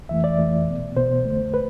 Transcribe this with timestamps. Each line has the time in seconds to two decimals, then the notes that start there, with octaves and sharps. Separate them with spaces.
0.09 F2 E3 A3 E5
0.24 D5
0.38 F2 E3 A3
0.67 B2 B3
0.96 B2 B3 C5
1.25 F2 D3 A3
1.54 B4